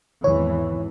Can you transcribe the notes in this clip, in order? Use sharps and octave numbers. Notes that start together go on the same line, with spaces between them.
G#1 E2 E3 C#5